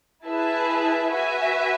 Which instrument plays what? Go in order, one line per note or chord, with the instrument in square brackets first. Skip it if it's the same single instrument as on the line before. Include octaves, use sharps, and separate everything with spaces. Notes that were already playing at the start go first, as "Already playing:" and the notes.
[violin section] E4 G#4 B4 E5 A5
F#4 B4 E5 G#5